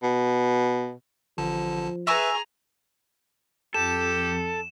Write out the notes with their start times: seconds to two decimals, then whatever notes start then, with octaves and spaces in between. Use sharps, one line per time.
0.03 B2
1.38 A1 D3 F3 A5
2.07 G#4 B4 E5 G#5 A#5 C#6 E6
3.74 F2 G4 A4 E7